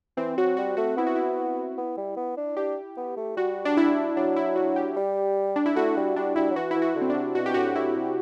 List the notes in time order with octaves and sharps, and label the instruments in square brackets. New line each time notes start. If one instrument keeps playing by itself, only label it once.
[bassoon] E3 [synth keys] C4
[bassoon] F#3 [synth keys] F#4
[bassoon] G3 [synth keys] F#4
[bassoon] A3 [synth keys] F#4
[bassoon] B3 [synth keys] E4
[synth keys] F#4
E4
[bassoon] B3
G3
B3
D4
[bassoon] D4 [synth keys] G4
[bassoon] B3
A3
[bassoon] G3 [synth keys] F#4
[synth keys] D4
E4
[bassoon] F#3 [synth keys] D4
[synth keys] E4
F#4
G4
[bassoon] G3
[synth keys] D4
E4
[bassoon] A3 [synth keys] F#4
[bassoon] G3
[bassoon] G3 [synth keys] D4
[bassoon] G3 [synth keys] E4
[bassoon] F#3
[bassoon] E3 [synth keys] F#4
[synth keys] E4
[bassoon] E3
[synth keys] F#4
[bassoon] D3
[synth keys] C4
D4
[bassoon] C3
[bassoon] B2 [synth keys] F#4
[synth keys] G4
[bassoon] A2 [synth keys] F#4
[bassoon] A2 [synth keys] E4
[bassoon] C3